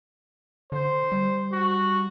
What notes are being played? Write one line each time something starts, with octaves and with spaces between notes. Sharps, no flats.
D3 C5
G3
F#4